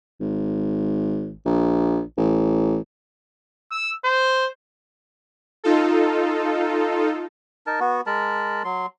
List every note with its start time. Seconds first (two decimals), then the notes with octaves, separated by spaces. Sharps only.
0.21 G#1
1.46 A#1
2.17 A1
3.72 E6
4.05 C5
5.64 D#4 F4 A4
7.67 D#4 A#4 A5
7.80 B3 F#4
8.07 G#3 A#4 A5 B5
8.64 F#3 C6